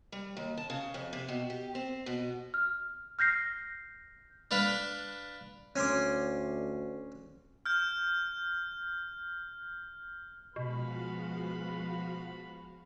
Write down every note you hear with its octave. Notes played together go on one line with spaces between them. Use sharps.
G3
D#2
A5
C#3
F2
C3
B2
G4
C4
B2
F6
F6 G6 A#6 C7
D4 B4 F5 A5 B5
D2 C#4 C6 D6
F6 G6
B2 F3 G#3 B3 F#4 F5 B5